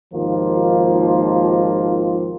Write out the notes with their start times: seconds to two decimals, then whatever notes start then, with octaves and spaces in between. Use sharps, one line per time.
0.13 G#1 D#2 D#3 F3 A#3 F4